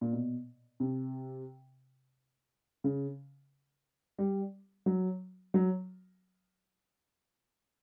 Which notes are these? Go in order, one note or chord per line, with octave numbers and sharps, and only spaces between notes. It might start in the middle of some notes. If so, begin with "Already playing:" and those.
A#2
B2
C3
C#3
G3
F#3
F#3